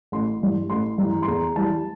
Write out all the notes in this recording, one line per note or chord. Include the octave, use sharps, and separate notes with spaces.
A1 C6
G2 E3
A1 C6
G2 E3 A#5
C6
E2 A#5
E3 G3 A5